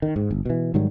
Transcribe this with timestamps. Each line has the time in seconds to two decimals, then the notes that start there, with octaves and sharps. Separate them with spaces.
0.02 D#3
0.16 G#2
0.31 G1
0.45 B2 E3
0.74 G#2 D#3 F#3 G3